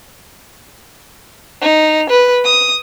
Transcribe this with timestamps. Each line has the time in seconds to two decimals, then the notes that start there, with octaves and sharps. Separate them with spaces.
1.62 D#4
2.10 B4
2.45 D#6